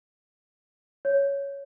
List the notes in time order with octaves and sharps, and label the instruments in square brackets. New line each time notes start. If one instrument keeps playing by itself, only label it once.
[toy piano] C#5